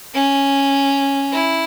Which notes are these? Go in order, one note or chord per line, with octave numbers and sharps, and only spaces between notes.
C#4
E4